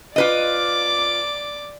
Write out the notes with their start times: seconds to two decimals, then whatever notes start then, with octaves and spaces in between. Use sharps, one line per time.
0.16 F4 B4 D5 D#5 D6